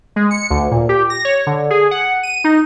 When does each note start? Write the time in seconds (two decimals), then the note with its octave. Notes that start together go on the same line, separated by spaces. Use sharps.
0.16 G#3
0.31 C#7
0.50 D2
0.71 A#2
0.89 G4
1.10 A#6
1.25 C#5
1.47 D3
1.70 G#4
1.91 F#5
2.23 D#7
2.44 D#4